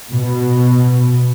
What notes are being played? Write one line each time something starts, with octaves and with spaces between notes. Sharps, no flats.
B2